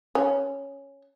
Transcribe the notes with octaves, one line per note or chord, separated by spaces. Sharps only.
C#4